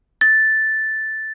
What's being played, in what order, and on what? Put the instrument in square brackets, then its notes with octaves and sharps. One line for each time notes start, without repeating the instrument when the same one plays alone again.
[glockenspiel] A6